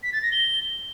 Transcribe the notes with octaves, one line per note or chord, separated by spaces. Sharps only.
B6
A6
A#6
G7